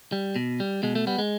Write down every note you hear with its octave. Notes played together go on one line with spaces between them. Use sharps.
G3
B2
G3
B2 G#3
A3
G3 B3
G#3